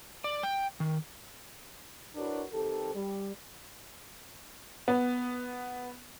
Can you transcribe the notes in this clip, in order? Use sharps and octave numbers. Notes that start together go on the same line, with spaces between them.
D5
G5
D#3
D4 E4 F#4 A#4 B4 C#5
D#3 C4 G4 A4
G3
B3